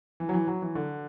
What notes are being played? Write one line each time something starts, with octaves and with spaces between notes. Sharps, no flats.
E3
F#3
E3
F#3
E3
D3